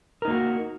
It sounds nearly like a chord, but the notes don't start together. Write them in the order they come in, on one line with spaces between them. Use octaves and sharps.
A#4 D#4 A#3 F#4